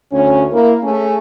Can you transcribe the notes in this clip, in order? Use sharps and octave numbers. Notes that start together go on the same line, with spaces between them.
D2 C#4
A#3 E4 A#4
A3 C#4 G#4